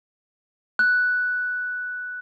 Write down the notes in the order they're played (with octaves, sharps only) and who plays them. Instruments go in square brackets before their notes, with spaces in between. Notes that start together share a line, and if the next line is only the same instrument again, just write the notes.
[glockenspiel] F#6